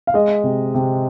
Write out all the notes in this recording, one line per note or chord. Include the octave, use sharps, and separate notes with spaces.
F5
G#3 D#5
C3
C3